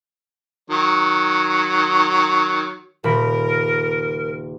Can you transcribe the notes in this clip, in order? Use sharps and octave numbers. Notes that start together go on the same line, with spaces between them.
D#3 F#3
D#1 C#3 A#4 B5